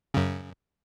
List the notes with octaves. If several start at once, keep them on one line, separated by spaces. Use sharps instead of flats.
F#2 C#3